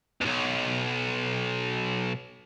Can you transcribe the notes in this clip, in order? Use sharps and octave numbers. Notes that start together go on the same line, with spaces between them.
B1 E2